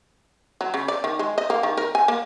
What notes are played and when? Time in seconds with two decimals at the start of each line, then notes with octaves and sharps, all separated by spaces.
0.61 F#3
0.74 C#3
0.88 D5
1.04 D#3
1.19 G#3
1.38 D#5
1.50 A#3
1.63 D#3
1.77 A#4
1.95 G#5
2.08 A#3